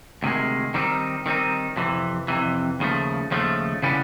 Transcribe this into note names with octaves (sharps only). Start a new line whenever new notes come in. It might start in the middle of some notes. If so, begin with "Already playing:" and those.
D2 C3 D#3 G#3
D#3 G3 C4 D#4
D#3 G3 C4 D#4
F2 C3 E3
F2 C3 E3
D#2 C#3 F3 A3
D#2 C#3 F3 A3
C#3 E3 G3 B3 D4